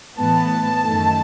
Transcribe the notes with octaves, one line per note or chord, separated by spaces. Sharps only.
A2 E3 B3 A5
F#2 D#3 A3